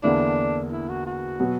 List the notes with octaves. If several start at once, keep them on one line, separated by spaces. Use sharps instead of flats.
E2 D3 A#3 D4 E4
E4
F#4
F#4
B2 F#3 B3